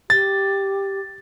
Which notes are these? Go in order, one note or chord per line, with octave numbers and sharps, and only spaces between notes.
G4 A6